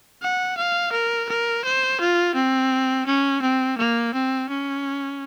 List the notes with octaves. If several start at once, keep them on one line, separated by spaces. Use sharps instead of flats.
F#5
F5
A#4
A#4
C5
F4
C4
C#4
C4
A#3
C4
C#4